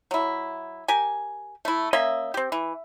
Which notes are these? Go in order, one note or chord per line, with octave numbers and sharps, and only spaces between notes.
F#3 E4
G4 A#4 G#5
A3 E4
A#3 C#4 D#5 E5
C4 G4
E3